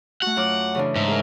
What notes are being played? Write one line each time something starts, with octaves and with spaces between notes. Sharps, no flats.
A3 F#4 F#5
F#2 F4 D6
C#3 E3 D4
G#2 E5
G#4 A#4